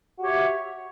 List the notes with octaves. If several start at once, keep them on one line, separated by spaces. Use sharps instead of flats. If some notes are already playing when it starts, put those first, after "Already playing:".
F#4 G4 C#5 E5